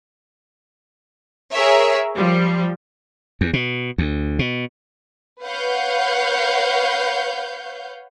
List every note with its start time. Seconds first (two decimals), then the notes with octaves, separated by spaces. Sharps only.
1.52 G#4 A#4 C#5 E5
2.16 F3 G3
3.41 E2
3.53 B2
3.98 D2
4.39 B2
5.42 B4 C#5 F5 F#5 G6